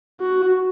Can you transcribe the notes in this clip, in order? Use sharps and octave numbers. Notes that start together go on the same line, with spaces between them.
F#4